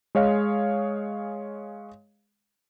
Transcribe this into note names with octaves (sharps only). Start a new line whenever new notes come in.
G#3 G#4 C#5 D#5 F5